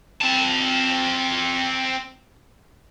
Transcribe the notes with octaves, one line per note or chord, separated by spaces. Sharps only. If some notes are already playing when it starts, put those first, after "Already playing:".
C4 A5